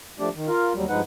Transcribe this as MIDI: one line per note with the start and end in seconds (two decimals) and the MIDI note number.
0.20 0.29 53
0.20 0.29 57
0.20 0.29 62
0.20 0.29 67
0.20 0.29 74
0.35 0.48 51
0.48 0.73 65
0.48 0.73 70
0.48 0.73 77
0.75 0.85 39
0.75 0.85 54
0.75 0.85 55
0.89 1.01 43
0.89 1.01 53
0.89 1.01 56
0.89 1.01 63
0.89 1.01 71
0.89 1.01 78